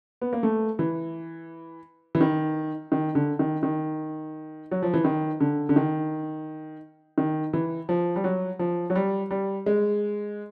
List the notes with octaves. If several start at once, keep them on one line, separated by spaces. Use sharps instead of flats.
B3
A#3
A3
E3
E3
D#3
D#3
D3
D#3
D#3
F#3
F3
E3
D#3
D3
D3
D#3
D#3
E3
F3
G3
F#3
F3
F#3
G3
G3
G#3